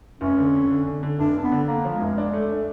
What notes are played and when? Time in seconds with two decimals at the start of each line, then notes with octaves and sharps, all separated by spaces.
0.21 F1 C#4
0.38 D3
0.54 F2
0.70 D3
0.87 D3
1.03 D3
1.19 F1 D4
1.36 F2
1.44 B3
1.52 D3
1.68 D3 A#3
1.85 F3
1.93 G#3
2.01 F1
2.18 D4
2.33 A3
2.50 D4